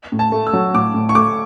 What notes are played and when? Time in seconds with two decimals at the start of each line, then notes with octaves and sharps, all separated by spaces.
0.12 A2
0.19 A5
0.32 A3
0.47 E6
0.53 F#3
0.74 A2 D6
0.94 A2
1.09 C#6
1.15 A3 D6